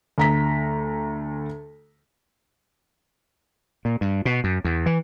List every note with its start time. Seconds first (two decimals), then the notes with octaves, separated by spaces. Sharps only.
0.18 D2 A#5 B6
3.85 A#2
4.01 G2
4.25 B2
4.44 F#2
4.64 E2
4.86 E3